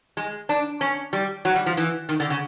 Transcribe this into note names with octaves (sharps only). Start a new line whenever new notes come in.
G#3
D4
C#4
G3
F#3
G3
F3
E3
D#3
D3
C#3